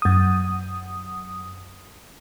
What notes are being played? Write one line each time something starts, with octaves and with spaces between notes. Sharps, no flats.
F#2 D#6